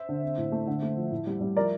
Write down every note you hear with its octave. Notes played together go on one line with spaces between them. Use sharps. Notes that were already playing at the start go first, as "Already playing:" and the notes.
Already playing: C5 E5
D3
C4
A2
A3
D3
A3
F3
A2
G3
G3
F3 A#4 D5